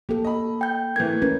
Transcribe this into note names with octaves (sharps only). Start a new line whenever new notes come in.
A#3 G4 A4
D#5 B5
G5 G6
E3 A3 A#3 G#6
C#4 A#4 B4